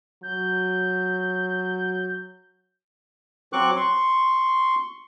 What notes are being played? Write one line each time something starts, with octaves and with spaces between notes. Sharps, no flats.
F#3 G6
F#3 C4 C#6 D6 F#6
C6 C#6